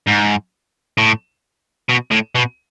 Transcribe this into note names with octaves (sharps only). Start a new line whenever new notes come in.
G#2
A2
B2
A2
B2